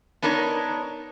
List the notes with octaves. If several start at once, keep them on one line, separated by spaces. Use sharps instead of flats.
B3 D4 D#4 A#4 C#5